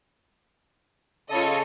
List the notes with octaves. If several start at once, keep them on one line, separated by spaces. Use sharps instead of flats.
C#3 F4 A4 C#5 D#5